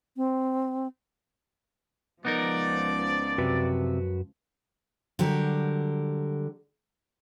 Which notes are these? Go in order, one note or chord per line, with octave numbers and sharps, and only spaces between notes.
C4
C#2 F3 B3 D#4 A#4 D5
F#2 C3 F#4 B4
D3 F#3 G3 G4 A#4